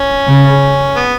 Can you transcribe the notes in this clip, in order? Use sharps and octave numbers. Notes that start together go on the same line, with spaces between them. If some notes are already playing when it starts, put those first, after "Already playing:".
Already playing: C#4
C#3
B3